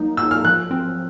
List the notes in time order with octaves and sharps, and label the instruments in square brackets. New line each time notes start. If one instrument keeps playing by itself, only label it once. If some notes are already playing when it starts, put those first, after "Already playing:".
Already playing: [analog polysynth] F#3 A#3 D#4
[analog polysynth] F#3 [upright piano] E6
[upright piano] F6
[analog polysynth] F3 [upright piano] F#6
[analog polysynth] C4